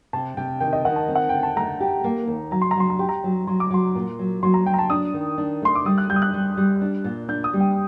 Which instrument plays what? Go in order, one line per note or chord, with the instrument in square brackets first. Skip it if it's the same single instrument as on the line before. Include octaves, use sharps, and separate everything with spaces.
[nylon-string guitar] C3 [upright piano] A5
[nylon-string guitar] C3 [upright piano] G5
[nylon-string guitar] D#3 [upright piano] G5
[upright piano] D#5
[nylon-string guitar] D#3 [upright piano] F#5
[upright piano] A5
[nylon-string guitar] C4
[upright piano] F#5
[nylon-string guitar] D3 [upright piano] G5
[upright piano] A5
[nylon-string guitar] A3 [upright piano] A#5
[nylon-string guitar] G4
A#3
D#2
[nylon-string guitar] F#3 [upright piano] A#5
[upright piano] C6
A#5
[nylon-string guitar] F#3 [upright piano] C6
[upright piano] A#5
[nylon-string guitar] G4 [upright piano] C6
[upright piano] A#5
[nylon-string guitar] F#3
[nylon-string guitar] F#3 [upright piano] C6
[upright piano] D6
[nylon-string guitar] F#3 [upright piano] C6
[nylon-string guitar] A#2
F#3
[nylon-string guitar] F#3 [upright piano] C6
[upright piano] A#5
[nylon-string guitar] F#3 [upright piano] G5
[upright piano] A#5
A5
[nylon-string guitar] D4 [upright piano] D#6
[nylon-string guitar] D#3
D4
[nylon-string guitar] A3 [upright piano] C6
[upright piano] D6
[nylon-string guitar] G3 [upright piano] D#6
[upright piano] F#6
[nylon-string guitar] G3 [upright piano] G6
[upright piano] D#6
F#6
[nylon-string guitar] G3
G3
D4
A#2
[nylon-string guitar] D4 [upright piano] G6
[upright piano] D#6
[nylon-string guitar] G3
[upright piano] G5